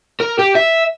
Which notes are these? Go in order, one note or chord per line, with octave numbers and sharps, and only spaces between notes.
A#4
G4
E5